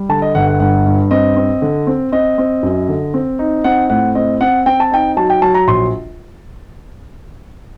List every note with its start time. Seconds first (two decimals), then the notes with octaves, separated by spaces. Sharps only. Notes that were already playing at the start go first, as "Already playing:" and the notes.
Already playing: G3
0.09 D3 A5
0.22 D#5
0.35 G1 F#5
0.47 F#5
0.60 G2 F#5
0.86 G2
1.11 C4 D#5
1.37 C4
1.62 D3
1.87 C4
2.12 C4 D#5
2.38 C4
2.63 F#2
2.89 D3
3.14 C4
3.39 D#4
3.64 C4 F#5
3.90 A2 F#5
4.15 C4 D#5
4.41 C4 F#5
4.66 C4 G5
4.80 A5
4.91 D#4 G5
5.17 F#3 A5
5.30 G5
5.42 F#3 A5
5.54 A#5
5.67 A#1 C6